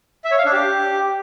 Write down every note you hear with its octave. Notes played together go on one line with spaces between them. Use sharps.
E5
C#5
F5
D4
G4